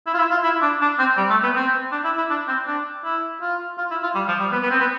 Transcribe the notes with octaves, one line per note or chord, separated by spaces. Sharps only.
E4
F4
E4
F4
E4
D4
D4
C4
G3
A3
B3
C4
D4
E4
E4
D4
C4
D4
E4
F4
F4
E4
F4
G3
F3
G3
B3
B3
C4
B3